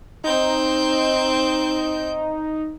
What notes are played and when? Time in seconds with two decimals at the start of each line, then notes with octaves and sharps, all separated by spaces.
0.24 C4 D#4 G6